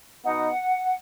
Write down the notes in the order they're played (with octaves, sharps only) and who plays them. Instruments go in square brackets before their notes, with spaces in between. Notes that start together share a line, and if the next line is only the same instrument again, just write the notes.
[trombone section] B2 B3 D#4 [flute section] F#5